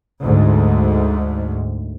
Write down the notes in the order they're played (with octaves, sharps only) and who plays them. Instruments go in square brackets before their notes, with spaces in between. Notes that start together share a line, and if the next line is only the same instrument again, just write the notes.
[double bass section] D2 G#2